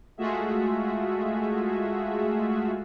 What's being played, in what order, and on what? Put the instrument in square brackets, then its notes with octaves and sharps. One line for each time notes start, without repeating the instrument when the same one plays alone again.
[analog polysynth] G#3 A3 F4 F#4 G#4 E5